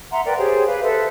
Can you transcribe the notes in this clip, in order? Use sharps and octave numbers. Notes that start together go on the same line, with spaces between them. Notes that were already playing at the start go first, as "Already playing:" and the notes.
E5 F#5 A#5 C6
A#4 B4 D5 G5
G4 G#4 C5 C#5
B4 F5
A4 B4 C5 E5